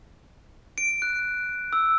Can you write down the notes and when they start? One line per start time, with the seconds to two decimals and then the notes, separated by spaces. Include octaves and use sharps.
0.78 D7
1.02 F#6
1.73 E6